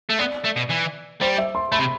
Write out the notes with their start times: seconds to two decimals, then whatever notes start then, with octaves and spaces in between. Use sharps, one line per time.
0.10 A3
0.19 B3 D5
0.45 A3
0.57 B2
0.70 E3
1.21 G3 C5
1.38 E5
1.55 C6
1.72 A3 B5
1.79 C3